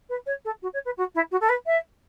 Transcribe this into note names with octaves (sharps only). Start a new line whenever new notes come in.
B4
C#5
A4
F#4
C#5
B4
F#4
E4
F#4
A4
B4
E5